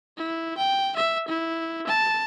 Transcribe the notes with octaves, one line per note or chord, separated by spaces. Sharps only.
E4
G5
E5
E4
A5